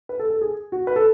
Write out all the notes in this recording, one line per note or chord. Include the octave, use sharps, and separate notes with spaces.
B4
A4
A4
G#4
F#4
B4
A4